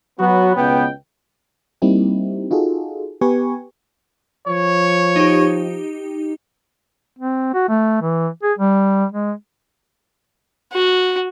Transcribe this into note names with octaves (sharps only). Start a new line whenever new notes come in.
F#3 B3 F#4
C#2 B2 B3 G5
G3 A#3 C4 D#4 E4 G4
D#4 F4 F#4 G#4 A4
B3 G4 B4 G#5 C#6
F3 C#5
D#4 G4
C4
F#4
A3
E3
G#4
G3
G#3
F#4